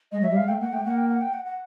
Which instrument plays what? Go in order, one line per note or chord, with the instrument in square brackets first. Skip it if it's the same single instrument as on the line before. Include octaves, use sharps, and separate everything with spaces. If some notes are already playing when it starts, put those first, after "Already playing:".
[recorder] G#3 [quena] D#5
[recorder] F#3
[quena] E5
[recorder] G3
[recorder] G#3 [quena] F5
[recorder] A3 [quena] G5
[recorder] A#3 [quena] F#5
[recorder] A3 [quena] G5
[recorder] A#3 [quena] F#5
[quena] G5
F#5
G5
F#5
F#5